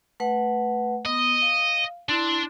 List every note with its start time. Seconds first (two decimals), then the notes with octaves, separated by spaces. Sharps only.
0.20 A3 B4 F#5
1.05 B3 D#5 D#6
1.42 F5
2.09 D4 E4 C6